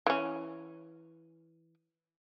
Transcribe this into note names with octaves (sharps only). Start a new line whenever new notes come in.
E3 C#4